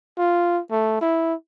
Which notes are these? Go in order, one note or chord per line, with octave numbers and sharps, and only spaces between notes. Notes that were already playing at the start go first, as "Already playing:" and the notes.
F4
A3
E4